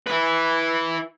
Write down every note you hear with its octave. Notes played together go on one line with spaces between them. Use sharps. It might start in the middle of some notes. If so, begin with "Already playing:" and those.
E4 B4